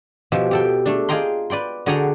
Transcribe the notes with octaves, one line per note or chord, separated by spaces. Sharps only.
B2 F3 G4 E5
G4 A4 G5
A3 D4
F4 G#4 D#5 G5 A#5 C6
B4 D5 G5 C6
D3 F#4 G#4 D5 G5 A#5